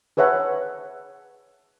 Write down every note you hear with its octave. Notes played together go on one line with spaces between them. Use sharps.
G#4 B4 C#5 E5 F#5 A5